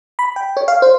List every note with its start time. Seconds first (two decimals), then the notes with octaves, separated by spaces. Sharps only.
0.19 B5
0.36 G5
0.57 C#5
0.68 F5
0.82 C5